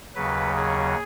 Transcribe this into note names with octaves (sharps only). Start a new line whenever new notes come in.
D#2 C#3 F#3 B4
G#4